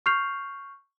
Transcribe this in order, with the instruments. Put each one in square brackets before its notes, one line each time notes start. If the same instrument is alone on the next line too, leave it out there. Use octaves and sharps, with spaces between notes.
[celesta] C#6 F6 G6 C7 F7